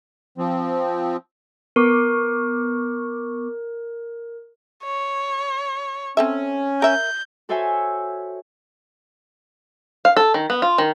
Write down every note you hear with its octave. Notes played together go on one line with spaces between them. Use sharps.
F3 C4
B3 A#4 C#6 D6
C#5
C4 C#4 A4 E5
A#4 E5 G6
F#4 A4 C5 C#5 E5 G#5
F5
A4
D#3
B3
F4
D#3